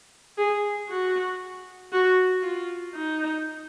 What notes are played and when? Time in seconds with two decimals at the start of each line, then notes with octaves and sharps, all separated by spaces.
0.38 G#4
0.89 F#4
1.92 F#4
2.44 F4
2.95 D#4